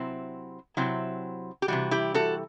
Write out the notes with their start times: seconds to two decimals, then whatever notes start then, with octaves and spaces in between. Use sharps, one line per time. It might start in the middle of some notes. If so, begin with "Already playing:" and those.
Already playing: C3 F#3 C4 E4
0.77 C3 F#3 C4 E4
1.62 G4
1.68 C3 E3 G3 F#4
1.91 E4 G4
2.14 F#4 A4